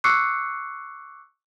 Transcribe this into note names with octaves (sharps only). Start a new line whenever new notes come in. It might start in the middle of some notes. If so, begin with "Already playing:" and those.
C#6 D6 E6 F#6 C7 C#7